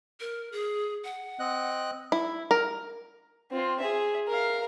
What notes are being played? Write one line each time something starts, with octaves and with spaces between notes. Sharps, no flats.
A#4
G#4
F#5
C4 D#5 F#6
E4
A#4
C4 F4
G#4 E5
A#4 F5